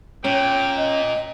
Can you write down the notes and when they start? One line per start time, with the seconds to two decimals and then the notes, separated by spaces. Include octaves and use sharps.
0.24 A#2 C#4 G5
0.77 D#5